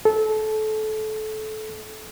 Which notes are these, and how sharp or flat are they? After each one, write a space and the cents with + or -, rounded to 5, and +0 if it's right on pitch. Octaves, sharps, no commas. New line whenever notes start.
A4 -25